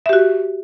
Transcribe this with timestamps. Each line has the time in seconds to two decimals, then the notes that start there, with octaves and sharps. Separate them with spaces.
0.06 E5
0.09 G4
0.13 F#4